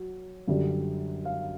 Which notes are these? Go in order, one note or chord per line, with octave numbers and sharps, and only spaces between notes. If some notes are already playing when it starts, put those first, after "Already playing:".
Already playing: F#3
F#2 D3 G3
F5